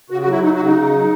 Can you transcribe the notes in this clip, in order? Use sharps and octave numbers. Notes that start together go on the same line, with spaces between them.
C#3 F#4
F#4
F#3
E4
F#3 D#4
F#4
C#3
D#4
C#3
F#3